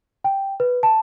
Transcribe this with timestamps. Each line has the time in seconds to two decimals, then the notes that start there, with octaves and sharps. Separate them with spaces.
0.24 G5
0.60 B4
0.83 A5